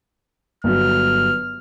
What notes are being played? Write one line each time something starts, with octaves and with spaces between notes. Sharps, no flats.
G1 F#3 F6